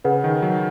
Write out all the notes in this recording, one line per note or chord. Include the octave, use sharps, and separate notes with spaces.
C#3 G#4 B4 F#5
D#3
F#3